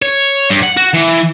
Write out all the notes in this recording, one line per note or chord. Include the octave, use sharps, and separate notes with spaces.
C#5
G2
F#5
F#4
E3